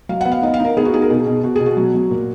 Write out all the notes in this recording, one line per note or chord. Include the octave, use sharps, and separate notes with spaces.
F#3 F5
B3 F#5
F5
D#4 D#5
F5
D#4 A#4
B3 G#4
F#4
D#4 G#4
A#4
B2 G#4
B2
B2 F#4
B2 G#4
F#4
F#3
F#3
A#2